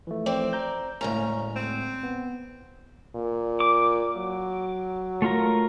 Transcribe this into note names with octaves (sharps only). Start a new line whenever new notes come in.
E3 F3 A3
C4 D5
A#5 G6
D2 A2 C#3 G#3 A#3 C#4 A#5
C4
B3
A#2
D6
F#3
A3 F4 A#4